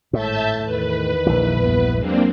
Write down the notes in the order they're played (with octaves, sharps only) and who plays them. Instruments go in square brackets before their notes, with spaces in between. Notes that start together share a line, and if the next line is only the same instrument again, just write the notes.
[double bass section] G#1 [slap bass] A2 [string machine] E5 A5 G6
[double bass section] E2 D#3 [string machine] B4
[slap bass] A#1 E3
[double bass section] E2 G2 B3
[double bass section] F#3 G#3 [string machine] A#3 C4 D4